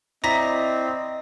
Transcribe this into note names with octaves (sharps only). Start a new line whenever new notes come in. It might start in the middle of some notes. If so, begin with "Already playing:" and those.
C4 E4 D5 D#5 A#5 A#6 B6